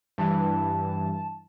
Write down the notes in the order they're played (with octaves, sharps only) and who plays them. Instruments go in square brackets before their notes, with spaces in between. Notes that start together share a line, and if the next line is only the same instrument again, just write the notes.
[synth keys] G2 E3 [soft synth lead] A5